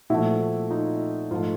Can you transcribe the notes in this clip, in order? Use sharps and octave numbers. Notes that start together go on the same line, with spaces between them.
A#2 F3 A3 E4 F#4
D#4 F4
G#2 F3 A3 D#4 F4